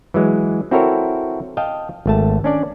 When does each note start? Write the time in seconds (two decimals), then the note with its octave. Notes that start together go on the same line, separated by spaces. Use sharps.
0.14 E3 F#3 G#3
0.71 C4 E4 F#4 A4 A#4 C#5
1.57 D#5 F5 G5 A5
2.06 G#1 A3 A5
2.44 C#4 D4 D5